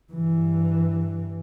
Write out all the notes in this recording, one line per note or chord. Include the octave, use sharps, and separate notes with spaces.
G2 E3